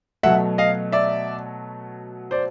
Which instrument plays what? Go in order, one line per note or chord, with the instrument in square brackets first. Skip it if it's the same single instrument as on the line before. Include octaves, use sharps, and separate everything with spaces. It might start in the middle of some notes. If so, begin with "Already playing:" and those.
[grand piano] B2 F#3 A3 E5 F#5
D#5 F5
D5 E5
C5 D5